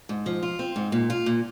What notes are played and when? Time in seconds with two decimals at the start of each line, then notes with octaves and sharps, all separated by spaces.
0.09 G#2
0.26 F3
0.43 F4
0.59 C4
0.76 G#2
0.92 A#2
1.10 F4
1.26 A#2